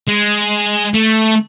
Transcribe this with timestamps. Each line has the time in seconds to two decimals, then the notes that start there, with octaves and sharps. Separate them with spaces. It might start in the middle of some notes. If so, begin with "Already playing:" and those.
0.08 G#3
0.94 A3